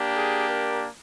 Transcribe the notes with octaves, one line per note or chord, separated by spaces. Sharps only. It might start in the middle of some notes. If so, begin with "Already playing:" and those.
Already playing: A#3 D4 G4
G#4
A#4